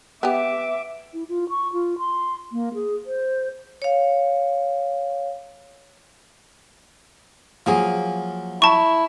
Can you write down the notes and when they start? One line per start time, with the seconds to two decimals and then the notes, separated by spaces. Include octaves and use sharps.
0.23 B3 G4 E5 D6
1.14 E4
1.29 F4
1.49 C#6
1.73 F4
1.98 C6
2.52 A#3
2.74 G#4
3.06 C5
3.82 C#5 F5
7.66 F3 F#3 A#3 G#4 G#5
8.62 E4 A5 C#6